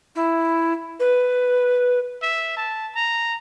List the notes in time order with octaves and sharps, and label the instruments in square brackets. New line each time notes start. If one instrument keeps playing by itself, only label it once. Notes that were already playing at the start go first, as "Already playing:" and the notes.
[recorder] E4
B4
[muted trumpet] E5
A5
A#5